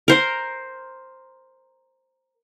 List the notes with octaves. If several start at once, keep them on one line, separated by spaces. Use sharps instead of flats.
A#4 C5